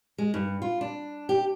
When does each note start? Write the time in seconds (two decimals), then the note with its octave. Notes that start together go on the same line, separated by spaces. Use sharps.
0.18 G#3
0.34 G2
0.62 F4
0.81 D4
1.29 G4